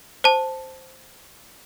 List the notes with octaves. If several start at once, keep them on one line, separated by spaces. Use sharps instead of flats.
C5 A5